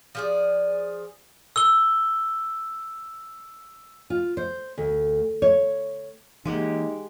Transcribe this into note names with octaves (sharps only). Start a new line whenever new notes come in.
F3 G#4 D5
E6 G7
F4
C5
D2
C#5
E3 G#3 A#3 D#4 G4 F#5